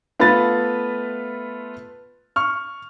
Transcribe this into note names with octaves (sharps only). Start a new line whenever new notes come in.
A3 B3 F4 B4 B5 A6
C#6 F6